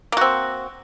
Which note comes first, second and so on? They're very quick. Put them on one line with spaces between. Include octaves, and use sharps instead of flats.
A#3 F#4 C4